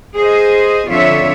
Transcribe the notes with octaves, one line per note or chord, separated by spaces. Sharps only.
G#4 C5 D#5
F2 D3 F4 C#5 E5